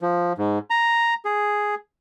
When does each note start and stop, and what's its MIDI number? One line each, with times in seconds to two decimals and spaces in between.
0.01 0.33 53
0.38 0.59 44
0.70 1.14 82
1.25 1.75 68